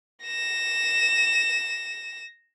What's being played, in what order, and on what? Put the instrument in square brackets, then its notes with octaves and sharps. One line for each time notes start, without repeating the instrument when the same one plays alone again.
[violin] A#6 E7